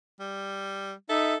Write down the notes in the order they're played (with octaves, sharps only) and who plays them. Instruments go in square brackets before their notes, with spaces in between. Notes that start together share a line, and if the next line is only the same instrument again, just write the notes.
[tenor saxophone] G3
[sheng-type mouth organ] D#4 E5 [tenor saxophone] A4